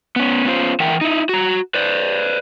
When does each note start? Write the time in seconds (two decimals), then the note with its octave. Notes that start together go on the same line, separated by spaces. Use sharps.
0.16 B3 C#4
0.45 B3 C#4 F4 C5
0.80 E3 A#4 E5 F#5 G5
1.01 D#4 E4
1.29 F#4 A#5
1.74 B4 C5 D5